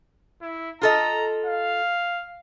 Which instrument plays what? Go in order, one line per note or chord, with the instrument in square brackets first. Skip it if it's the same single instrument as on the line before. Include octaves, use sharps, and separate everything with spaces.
[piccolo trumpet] E4
[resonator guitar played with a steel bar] F4 A4 D#5 [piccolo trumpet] A#5
[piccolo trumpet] F5